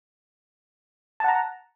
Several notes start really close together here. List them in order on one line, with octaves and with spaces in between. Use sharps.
A5 F#5 A#5